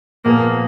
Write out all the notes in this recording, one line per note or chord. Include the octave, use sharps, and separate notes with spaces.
A#2 F3 A#3 B3 F4 G#4